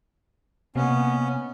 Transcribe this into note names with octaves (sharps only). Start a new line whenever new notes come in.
C3 A#3 B3 C#4 D#5 F5